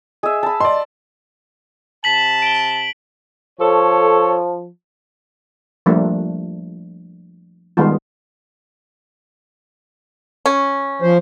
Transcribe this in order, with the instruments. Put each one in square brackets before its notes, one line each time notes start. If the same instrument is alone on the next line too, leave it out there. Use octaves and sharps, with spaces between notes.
[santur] G#4 E5 [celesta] D#5
[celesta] G#5 [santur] A5 B5
[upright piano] D5 C6 [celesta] D#5
[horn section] C3 A5 [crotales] B6 F#7
[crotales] D7 G7
[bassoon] F3 [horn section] A4 C#5
[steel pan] F3 G3 A3 A#3 D4
D#3 G3 G#3 B3 F4
[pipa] C#4
[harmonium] F3 C5